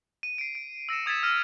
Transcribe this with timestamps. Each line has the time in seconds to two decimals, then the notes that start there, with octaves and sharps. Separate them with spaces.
0.23 D#7
0.38 C7 D7
0.55 D7
0.89 E6 A#6 C#7 E7
1.06 D#6 G#6 A6 B6 E7
1.23 F6 A#6 D#7